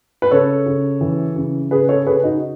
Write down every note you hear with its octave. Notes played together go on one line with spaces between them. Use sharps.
B4
C#3 A4 C#5
C#3
E3
C#3
C#3 G#4 B4
A4 C#5
C#3 G#4 B4
D#4 F#4